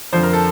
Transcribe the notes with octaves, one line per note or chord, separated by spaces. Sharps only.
F2 D3 F3 C5
A#4
A4